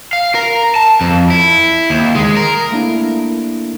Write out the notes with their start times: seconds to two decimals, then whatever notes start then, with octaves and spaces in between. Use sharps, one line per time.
0.13 F5
0.35 A#4
0.75 A5
1.01 F2
1.30 E4
1.90 D#2
2.15 G#3
2.37 A#4
2.71 A3 A#3 D4 E4